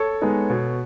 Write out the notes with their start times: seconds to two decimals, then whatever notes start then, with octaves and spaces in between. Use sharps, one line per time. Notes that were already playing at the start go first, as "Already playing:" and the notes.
Already playing: A4 C#5
0.22 G#3 B3 D#4
0.50 B2